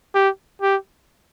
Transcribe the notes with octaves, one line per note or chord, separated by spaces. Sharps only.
G4
G4